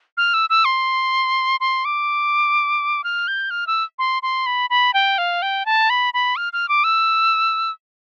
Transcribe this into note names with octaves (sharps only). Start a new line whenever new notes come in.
F6
E6
E6
C6
C6
D6
F6
G6
F6
E6
C6
C6
B5
B5
G5
F5
G5
A5
B5
B5
F6
F6
D6
E6